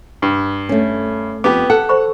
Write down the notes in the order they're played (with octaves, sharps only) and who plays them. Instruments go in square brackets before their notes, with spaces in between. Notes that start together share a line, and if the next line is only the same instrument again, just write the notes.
[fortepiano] G2
[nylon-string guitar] A3 C#4
[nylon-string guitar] F2 [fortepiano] B3 G4 [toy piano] A5 D6
[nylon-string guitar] A4 [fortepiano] F#5
[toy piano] C5 B5 C#6